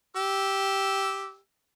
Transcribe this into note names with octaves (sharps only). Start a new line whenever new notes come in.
G4 E6